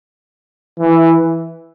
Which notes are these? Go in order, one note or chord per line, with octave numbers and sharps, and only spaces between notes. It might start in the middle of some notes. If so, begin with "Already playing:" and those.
E3